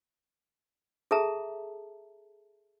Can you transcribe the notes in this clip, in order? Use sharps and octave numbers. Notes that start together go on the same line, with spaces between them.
G#4 A4 E5 A5 A#5